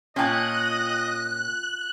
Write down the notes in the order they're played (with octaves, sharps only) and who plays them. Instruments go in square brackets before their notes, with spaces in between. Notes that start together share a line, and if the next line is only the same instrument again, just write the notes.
[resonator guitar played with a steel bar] A#2 C#4 [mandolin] F4 G5 A5 [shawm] D#5 [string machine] F#6